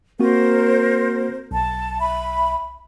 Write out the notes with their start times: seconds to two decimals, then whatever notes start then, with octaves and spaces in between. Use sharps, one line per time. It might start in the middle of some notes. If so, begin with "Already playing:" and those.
0.20 A#3 C4 F#4 A#4 C5
1.51 B1 A5
1.99 E5 B5